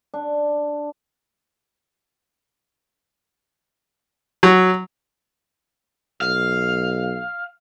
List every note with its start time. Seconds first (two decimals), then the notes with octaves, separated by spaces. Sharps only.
0.14 D4
4.43 F#3
6.21 B1 F5